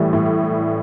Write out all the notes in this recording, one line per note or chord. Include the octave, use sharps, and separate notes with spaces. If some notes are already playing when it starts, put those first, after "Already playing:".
Already playing: A2 E3 G3
A2